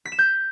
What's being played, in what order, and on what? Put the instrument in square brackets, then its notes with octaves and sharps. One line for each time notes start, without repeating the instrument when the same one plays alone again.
[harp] B6
E7
G6